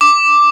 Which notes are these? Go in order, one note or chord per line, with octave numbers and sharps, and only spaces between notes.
D6